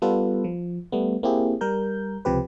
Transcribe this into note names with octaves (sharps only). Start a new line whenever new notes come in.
G3 B3 F4 A4 B4
F3
G3 A3 B3
A#3 C4 E4 G4 G#4
G3 A#4 G6
C#2 C3 F3 G4 B4